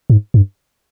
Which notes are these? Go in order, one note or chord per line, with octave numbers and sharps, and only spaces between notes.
G#2
G2